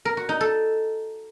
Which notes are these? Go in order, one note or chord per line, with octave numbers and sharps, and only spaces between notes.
A#4
F#4
D#4
A4